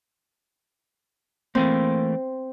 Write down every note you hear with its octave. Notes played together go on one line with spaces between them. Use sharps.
E3 A3 A#3 C4